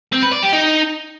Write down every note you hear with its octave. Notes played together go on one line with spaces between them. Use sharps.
C4
B4
D5
G4
D#4